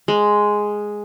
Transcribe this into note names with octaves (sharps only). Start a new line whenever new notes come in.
G#3